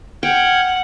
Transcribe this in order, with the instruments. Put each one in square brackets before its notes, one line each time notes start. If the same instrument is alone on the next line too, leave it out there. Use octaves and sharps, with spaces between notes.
[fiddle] F#5 [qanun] G5 [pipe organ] F6 G6 G#6